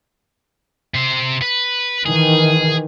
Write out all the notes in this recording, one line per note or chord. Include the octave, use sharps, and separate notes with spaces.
C3 C5
B4
D#3 E3 G#4